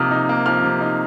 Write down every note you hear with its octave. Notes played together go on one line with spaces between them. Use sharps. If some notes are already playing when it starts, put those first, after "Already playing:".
Already playing: C3 F3 A#3 D#4 D#6 F6
D#4
A#3
F3 F6
C3
D#4